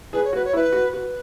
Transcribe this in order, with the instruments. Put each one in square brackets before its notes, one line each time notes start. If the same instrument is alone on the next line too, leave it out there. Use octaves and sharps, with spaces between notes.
[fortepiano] G#4 [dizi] B4
[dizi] C#5
[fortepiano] F#4 [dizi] B4
[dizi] C#5
[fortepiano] E4
[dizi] B4
[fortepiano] F#4
[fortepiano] F#4 [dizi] B4